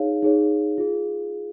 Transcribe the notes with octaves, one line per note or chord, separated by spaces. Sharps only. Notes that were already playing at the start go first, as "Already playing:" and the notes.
Already playing: D#4 G#4 C#5 F5
D#4 G#4 C#5
F4 G#4